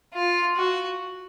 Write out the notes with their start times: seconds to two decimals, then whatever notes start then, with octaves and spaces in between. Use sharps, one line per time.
0.13 F4
0.56 F#4